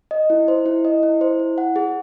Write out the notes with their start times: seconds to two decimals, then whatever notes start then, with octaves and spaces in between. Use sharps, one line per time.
0.11 D#5
0.30 E4
0.48 C5
0.66 E4
0.85 D#5
1.03 E4
1.21 C5
1.39 E4
1.58 F#5
1.76 G#4